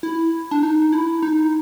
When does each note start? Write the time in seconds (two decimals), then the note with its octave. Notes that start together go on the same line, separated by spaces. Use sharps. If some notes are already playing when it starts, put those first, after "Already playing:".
0.03 E4
0.51 D4
0.63 D#4
0.92 E4
1.23 D#4